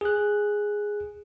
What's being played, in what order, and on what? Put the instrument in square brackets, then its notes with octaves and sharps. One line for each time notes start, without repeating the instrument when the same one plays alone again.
[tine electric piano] G#4 F#6